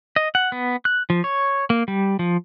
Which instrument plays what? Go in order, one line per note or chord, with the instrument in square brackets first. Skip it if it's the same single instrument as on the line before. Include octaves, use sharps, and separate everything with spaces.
[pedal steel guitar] D#5
F#5
B3
F#6
F3
C#5
A#3
G3
F3